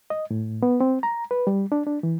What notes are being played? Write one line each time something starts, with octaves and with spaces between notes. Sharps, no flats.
D#5
A2
B3
C4
A#5
B4
G3
D4
D4
E3